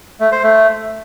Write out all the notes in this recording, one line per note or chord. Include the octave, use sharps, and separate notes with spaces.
A3
C5
A3